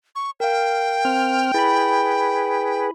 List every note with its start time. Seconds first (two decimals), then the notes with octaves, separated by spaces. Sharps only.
0.16 C#6
0.40 A#4 F5 G5
1.05 C4 F6
1.54 E4 G#4 B4 B5